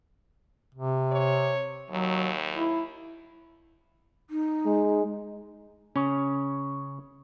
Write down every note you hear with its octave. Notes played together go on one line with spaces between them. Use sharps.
C3
C#5
D#2 F#3
E4
D#4
G#3
C#3 C#4